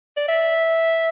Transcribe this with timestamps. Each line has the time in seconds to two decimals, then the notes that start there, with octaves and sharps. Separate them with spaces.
0.17 D5
0.28 E5